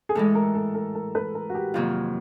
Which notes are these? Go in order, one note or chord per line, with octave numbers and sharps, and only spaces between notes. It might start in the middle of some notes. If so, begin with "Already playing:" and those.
G#4
A2 E3 G#3 A4
A#4
A4
A#4
A#4
B4
A#4
F#4
G4
F2 C3 D#3 F#3 A#3 F4